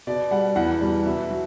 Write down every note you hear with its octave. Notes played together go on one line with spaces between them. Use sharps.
B2 D5
G3 F#5
E2 F#5
B2 G3
B2 E5
F#3